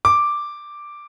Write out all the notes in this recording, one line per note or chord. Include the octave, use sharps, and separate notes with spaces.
D6